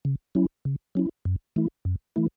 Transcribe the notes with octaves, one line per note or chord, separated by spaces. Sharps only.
C#3
F#3 C#4 E4
C#3
F#3 C#4 E4
F#2
E3 A3 E4
F#2
E3 A3 E4